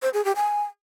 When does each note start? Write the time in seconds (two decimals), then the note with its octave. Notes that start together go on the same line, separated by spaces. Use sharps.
0.02 C5
0.14 G#4
0.25 G4
0.36 G#5